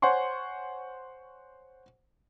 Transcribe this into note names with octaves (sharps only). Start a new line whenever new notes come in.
C5 C#5 F#5 G#5 C6 C#6